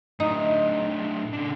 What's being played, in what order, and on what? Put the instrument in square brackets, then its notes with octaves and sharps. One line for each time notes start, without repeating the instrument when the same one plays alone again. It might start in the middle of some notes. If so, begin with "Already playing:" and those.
[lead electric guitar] A2 D4 [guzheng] D#4
[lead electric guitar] C#3 D4